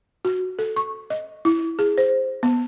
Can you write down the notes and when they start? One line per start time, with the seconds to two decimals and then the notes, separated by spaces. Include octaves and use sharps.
0.25 F#4
0.59 A4
0.76 C#6
1.10 D#5
1.45 E4
1.79 G#4
1.98 C5
2.43 B3